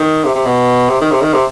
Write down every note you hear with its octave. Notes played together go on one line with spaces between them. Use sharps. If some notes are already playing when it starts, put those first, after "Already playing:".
Already playing: D#3
C3
C3
B2
C3
D#3
C3
D#3
C3